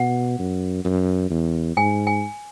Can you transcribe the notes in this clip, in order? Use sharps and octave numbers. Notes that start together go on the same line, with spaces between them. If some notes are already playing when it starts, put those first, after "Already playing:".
Already playing: B2 F#5
F#2
F#2
E2
G#2 G#5
G#5